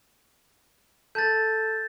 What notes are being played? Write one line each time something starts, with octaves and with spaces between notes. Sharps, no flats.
A4 A5 G6 A6